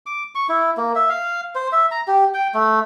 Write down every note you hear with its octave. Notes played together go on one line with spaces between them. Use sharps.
D6
C#6
E4
A#3
E5
F5
C5
E5
A#5
G4
G5
A3